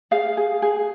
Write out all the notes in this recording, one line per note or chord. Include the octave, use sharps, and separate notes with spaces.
G#4 F5
G#4
G#4